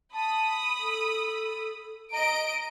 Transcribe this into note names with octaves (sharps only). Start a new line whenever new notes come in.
A5 B5 D#6
A4
D#5 A#5 D7